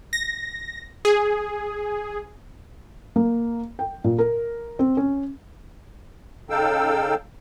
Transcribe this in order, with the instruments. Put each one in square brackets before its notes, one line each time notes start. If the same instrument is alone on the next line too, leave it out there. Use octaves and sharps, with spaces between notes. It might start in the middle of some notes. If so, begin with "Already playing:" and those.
[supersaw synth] A#6
G#4
[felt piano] A#3
G5
A#2
A#4
C4
C#4
[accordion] C#3 D#4 A4 F5 G5 E6